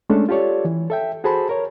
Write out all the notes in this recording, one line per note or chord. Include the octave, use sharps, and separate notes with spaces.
G#3 A3 C#4 D4 A4
F4 G4 A4 C#5 D5
E3
A4 E5 G5
F#4 G#4 A4 C5 A5 B5
A#4 C#5